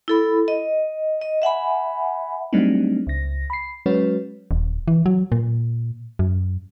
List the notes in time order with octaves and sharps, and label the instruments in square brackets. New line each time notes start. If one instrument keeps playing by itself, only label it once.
[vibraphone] E4 A4 B5
D#5
D#5
E5 F#5 G#5 B5
[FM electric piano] F#3 G3 A3 C4 D4 D#4
C#2 A#6
B5 C7
F#3 G#3 C#4 F#4 B4 C#5
[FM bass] D#1
E3
F#3
A#2
F#2